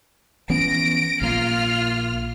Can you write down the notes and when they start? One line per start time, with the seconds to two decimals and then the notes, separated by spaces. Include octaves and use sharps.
0.50 E3 B3 C#4 A#6 D7
1.22 A#1 A#3 F4 F6